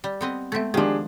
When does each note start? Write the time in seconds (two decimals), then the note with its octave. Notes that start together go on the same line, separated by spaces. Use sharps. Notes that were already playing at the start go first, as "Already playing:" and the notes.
0.04 G3
0.21 B3 C4 D#5
0.52 G#3 A3 B3 C4 E5
0.74 D#3 F3 G#3 D4 G4 G#4